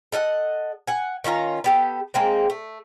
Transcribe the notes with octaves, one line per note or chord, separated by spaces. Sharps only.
A4 D#5 F5 F#5
F#5 G#5
D#3 C#4 F4 A#5
B3 G4 A4
G#3 A#3 C4
A3